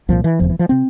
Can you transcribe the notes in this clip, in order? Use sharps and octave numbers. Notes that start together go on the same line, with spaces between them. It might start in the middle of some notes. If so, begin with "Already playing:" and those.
C2 A#2 F3
E3
F1 E2 C3 F3
E3
F3
C3 C4